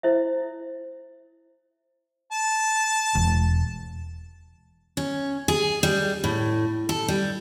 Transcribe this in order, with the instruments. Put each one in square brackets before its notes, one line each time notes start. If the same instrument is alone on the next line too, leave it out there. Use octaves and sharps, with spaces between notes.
[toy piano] E4 C5 E5
[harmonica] A5
[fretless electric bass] E1
[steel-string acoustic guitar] C#4
G#4
G3
A2
A4
G3